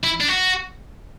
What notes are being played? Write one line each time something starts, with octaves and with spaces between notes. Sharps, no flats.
E4
D4
F#4